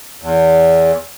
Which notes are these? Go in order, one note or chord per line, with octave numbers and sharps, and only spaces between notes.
E2